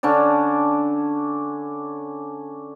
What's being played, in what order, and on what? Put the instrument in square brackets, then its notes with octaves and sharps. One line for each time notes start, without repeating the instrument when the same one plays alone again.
[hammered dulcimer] D3 C#4 D4 D5